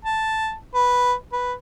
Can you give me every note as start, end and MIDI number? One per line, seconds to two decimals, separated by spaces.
0.05 0.54 81
0.74 1.13 71
1.32 1.53 71